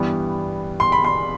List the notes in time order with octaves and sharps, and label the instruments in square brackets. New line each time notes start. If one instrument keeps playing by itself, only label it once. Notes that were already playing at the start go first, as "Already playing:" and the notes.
Already playing: [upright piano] G2 E3 G3 B3
C6
B5
C6